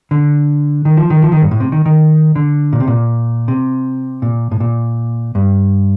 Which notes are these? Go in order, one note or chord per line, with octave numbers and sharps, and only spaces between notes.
D3
D#3
F3
D#3
F3
D#3
G2
A2
C3
D#3
D#3
D3
A#2
C3
A#2
C3
A#2
A2
A#2
G2